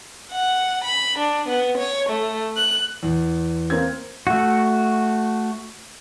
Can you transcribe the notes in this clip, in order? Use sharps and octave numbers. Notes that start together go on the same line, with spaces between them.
F#5
B5
D4
B3
C#5
A3
F#6
E2
A#3 C4 G#6
A3 F#4